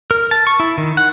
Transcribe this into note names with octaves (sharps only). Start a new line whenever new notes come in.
A#4
A5
C#6
E4
D#3
F#5